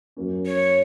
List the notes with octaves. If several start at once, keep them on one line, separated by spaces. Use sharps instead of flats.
F#2 F#3 A#3 C#4
C#5